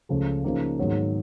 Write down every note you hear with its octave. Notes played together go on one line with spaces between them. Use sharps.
C#2 C#3 F3 A3
C#3 F3 A#3 D#4
G#2 D#3 F#3 B3